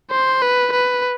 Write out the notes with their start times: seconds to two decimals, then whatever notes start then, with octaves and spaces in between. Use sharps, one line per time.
0.11 C5
0.42 B4
0.73 B4